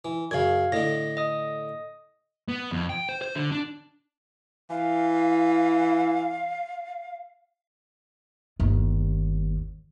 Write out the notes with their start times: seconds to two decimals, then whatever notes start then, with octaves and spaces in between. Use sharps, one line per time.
0.05 E3
0.31 F#2 C#3 F5 G#6
0.72 A2 D3 D#5 A#6
1.17 D#5 D#6
2.48 B3
2.71 F2
2.89 G5
3.09 C5
3.21 C5
3.35 D3
3.52 D4
4.70 E3 F5
8.60 G1 D#2